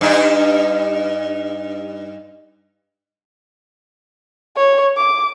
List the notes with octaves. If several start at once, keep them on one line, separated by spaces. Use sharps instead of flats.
G2 D#4
C#5
D6